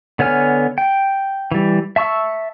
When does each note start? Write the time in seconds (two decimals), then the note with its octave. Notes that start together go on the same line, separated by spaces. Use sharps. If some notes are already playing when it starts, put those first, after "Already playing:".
0.19 D3 B3 C#5 G#5 F6
0.78 G5
1.52 E3 G3
1.96 E5 A5 C#6 E6